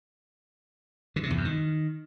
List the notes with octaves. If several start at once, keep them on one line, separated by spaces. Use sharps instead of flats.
D3
C3
E2
F#2
D#3